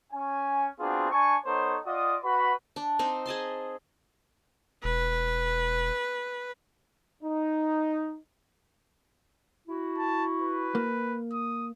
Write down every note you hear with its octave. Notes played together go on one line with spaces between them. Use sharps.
C#4 G#5
B3 C4 D4 F4 F#4 G#4
D4 G#5 A5 C#6
B3 D#4 A4 C5 C#5
F4 D5 D#5 F#5 D#6
F#4 B4 B5
D4
C4 D#4 C5
G#4 D#5 A5 C6
E1 B4
D#4
E4 F#4
A5
B4
A#3
D#6